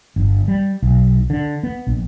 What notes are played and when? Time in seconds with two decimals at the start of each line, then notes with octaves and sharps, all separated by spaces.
0.16 G1
0.48 G3
0.82 B1
1.30 D3
1.63 B3
1.87 A#1